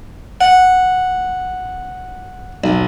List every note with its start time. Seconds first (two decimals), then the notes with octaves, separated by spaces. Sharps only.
0.41 F#5
2.64 B1